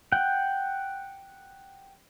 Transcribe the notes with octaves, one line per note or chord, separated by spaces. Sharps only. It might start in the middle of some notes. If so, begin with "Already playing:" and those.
F#5 G5